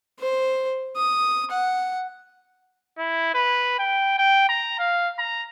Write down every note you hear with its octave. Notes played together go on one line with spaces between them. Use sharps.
C5
D#6
F#5
E4
B4
G5
G5
A#5
F5
A#5